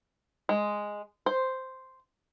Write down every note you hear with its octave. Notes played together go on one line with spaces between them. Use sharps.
G#3
C5